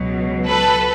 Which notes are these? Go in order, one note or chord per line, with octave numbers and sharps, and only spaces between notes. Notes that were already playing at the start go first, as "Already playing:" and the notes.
Already playing: C#2 B2 F#3
A4 B4